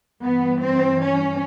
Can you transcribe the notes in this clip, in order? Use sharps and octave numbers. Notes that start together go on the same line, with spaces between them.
G2 E3 B3
C4
C#4